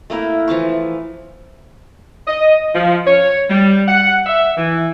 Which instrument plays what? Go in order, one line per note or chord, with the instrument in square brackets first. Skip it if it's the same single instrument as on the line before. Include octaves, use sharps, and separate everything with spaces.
[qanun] A3 A#3 E4 A#4
E3 F3 A5 C#6
[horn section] D#5
F3
C#5
G3
F#5
E5
E3